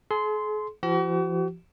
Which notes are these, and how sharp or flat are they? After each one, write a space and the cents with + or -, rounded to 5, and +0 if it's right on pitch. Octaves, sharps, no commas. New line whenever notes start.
G#4 +45 C6 -10
F3 -35 F#4 +45